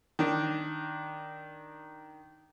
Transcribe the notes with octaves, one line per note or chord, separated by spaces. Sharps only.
D#3 D4